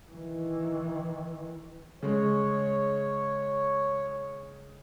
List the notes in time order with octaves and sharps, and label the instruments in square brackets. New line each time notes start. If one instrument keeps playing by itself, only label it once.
[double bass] D#3 E3
[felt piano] C#3 G#3 [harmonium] C#5